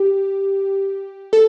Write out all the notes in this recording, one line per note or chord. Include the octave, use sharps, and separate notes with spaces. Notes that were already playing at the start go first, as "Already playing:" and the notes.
Already playing: G4
A4